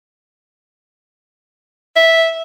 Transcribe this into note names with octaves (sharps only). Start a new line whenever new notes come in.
E5